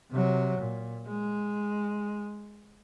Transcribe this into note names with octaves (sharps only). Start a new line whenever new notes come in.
C3 F#3
A#2
G#3